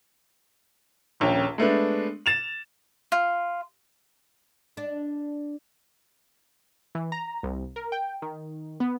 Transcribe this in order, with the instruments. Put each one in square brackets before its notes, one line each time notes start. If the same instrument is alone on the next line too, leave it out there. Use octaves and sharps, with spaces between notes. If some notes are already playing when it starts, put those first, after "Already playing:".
[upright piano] D#1 A#1 C#4 G5
G#3 A3 B3 D4
A6 E7 F7
[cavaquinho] F4
[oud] D4
[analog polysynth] E3
A#5
C2
A#4
G5
D#3
B3